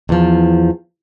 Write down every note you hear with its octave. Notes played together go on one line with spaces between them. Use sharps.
E2 F3